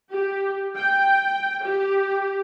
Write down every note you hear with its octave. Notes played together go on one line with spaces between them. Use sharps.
G4
G5
G4